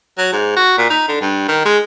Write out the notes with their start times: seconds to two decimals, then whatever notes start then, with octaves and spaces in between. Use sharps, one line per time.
0.18 F#3
0.33 G#2
0.57 F#4
0.78 A#2
0.90 D#4
1.08 D3
1.21 G2
1.48 D#3
1.66 G#3